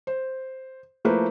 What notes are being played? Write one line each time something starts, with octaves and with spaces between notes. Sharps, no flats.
C5
F3 A3 A#3 E4 B4 C5